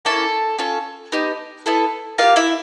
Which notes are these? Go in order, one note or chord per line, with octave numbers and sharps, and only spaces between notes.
A#3 C#4 E4 A4 A5
C#4 F4 A4
B3 D#4 G4
B3 E4 A4
A#3 D4 F4 G4 F5
E4 E5